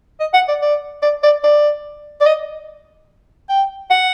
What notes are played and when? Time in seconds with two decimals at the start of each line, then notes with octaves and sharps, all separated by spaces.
0.20 D#5
0.34 F#5
0.48 D5
0.62 D5
1.02 D5
1.23 D5
1.44 D5
2.21 D5
2.26 D#5
3.49 G5
3.91 F#5